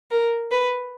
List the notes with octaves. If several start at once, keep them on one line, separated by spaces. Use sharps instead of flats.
A#4
B4